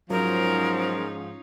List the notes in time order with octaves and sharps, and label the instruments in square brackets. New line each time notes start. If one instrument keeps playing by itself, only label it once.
[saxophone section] G#2 F3 [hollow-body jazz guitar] F#3 [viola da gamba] C#4 D#4 F4 [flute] A#4